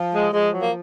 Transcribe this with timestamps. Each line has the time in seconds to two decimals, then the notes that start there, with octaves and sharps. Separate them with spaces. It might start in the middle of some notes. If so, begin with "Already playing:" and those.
Already playing: F3
0.13 G#3
0.31 F3 G#3
0.50 F#3
0.61 A#3